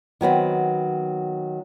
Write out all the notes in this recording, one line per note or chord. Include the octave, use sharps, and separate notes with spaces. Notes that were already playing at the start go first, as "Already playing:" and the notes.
D#3 F#3 B3 C4